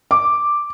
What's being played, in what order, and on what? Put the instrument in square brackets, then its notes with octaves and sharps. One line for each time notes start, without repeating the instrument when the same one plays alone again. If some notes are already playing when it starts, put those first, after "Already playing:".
[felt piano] D6